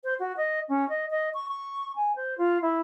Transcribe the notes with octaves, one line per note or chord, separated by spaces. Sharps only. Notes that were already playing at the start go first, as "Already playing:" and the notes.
C5
F#4
D#5
C#4
D#5
D#5
C#6
C#6
G#5
C5
F4
E4